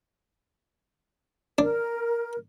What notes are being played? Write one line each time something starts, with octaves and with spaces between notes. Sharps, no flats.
D4 A#4